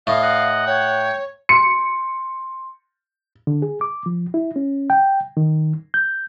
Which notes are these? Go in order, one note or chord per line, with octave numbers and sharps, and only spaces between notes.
A2 D#5 F5
D#5 F#5
C#5 G5
C6 C#7
D3
G#4
D6
F3
E4
C#4
G5
D#3
G6